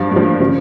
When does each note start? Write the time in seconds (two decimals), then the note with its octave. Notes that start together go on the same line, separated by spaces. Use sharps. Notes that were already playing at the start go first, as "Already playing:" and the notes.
Already playing: G2 F3 F5
0.11 G2
0.16 F3
0.40 C#3 F3